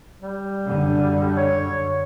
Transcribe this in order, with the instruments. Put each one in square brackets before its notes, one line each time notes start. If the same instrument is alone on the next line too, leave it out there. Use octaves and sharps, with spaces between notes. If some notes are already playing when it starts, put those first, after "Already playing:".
[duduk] G3
[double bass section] F#2 D3
[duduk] C#5